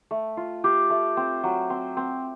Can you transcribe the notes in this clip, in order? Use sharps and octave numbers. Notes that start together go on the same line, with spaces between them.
A3
F4
F4 G4
A3
C4
F#3
C4
C4